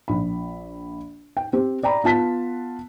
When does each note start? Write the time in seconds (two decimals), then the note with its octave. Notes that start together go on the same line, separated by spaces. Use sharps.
0.08 A#1 B5
1.37 G5
1.53 C4 G4
1.83 D5 G5 A#5 B5
2.04 B3 F4 A5 B6